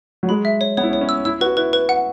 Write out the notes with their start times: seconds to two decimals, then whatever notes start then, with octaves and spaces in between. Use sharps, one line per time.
0.23 F#3
0.29 G#3 B5
0.45 E5
0.61 C#5
0.77 B3 C#5
0.83 E4
0.89 C#4
0.93 C#5
1.01 C#4
1.09 E6
1.25 E4 E6
1.41 F#4 B4
1.57 E4 B4
1.73 B4
1.89 F#5